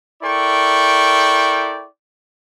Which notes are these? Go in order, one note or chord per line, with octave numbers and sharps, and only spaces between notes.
E4 A4 A#4 D5 G5 C#6